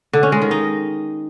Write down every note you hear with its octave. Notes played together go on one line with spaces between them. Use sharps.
D3
C#4
G#3
D#3
D#4